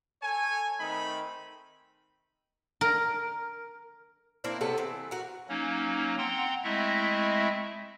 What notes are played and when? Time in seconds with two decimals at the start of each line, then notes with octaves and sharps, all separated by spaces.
0.23 A4 C#5 G#5
0.80 D#3 A3 C4 D#4 B5
2.81 A#4
4.44 A#3 C4 D4 E4
4.61 C3 F#3 B3 A4
4.78 E3 C4
5.11 F#4 A#4
5.49 F#3 A#3 C#4 D#4
6.18 C4 F#5 G5 A#5 C6
6.64 G#3 A3 C4 E4 D#5 E5